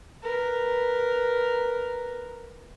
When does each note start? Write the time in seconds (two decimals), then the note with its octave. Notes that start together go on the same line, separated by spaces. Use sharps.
0.23 A#4 B4